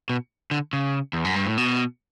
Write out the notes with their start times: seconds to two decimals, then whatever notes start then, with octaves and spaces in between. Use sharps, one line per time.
0.09 B2
0.51 D3
0.73 C#3
1.13 E2
1.25 F#2
1.35 G2
1.46 A2
1.57 B2